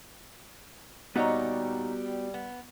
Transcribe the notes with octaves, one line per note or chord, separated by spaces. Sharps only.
A#2 G3 B3 D#4 F#4 C#5 F#5
B3